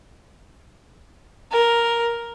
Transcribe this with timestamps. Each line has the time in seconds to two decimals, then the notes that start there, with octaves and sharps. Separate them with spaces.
1.51 A#4